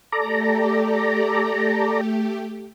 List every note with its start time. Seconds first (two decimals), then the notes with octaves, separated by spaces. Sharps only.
0.12 A3 G4 A4 D5 A#5